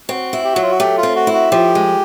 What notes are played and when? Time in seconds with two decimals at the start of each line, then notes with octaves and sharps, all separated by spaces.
0.09 C4 F#4
0.33 E4
0.45 G4
0.53 F#3 F#4
0.62 F4
0.71 F#4
0.80 A3 G4
0.98 F4
1.03 C4
1.15 F#4
1.27 E4
1.33 F#4
1.51 F3 G4
1.75 G#3